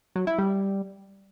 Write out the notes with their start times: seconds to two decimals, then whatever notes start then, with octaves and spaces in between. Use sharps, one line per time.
0.16 F#3
0.27 E4
0.38 G3